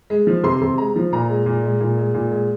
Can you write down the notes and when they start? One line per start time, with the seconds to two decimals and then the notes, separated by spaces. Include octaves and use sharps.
0.10 G#3
0.27 F3
0.44 C3 C6
0.61 C3
0.78 G#3 A#5
0.96 F3
1.13 A#2 A#5
1.29 G#3
1.46 A#2
1.64 G#3
1.80 A#2
1.97 G#3
2.14 A#2
2.31 G#3